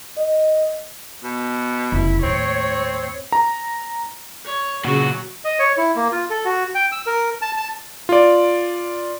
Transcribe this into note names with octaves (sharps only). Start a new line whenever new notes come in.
D#5
B2
F1 C#3 E4
D#2 A2 C4 C#5
A#5
C#5
A#2 C#3 F#3 F#4
D#5
C#5
E4
A#3
F4
A4
F#4
G5
E6
A#4
A5
A5
F4 D5